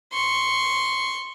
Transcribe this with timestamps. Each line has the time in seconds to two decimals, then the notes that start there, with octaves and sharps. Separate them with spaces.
0.13 C6 C#6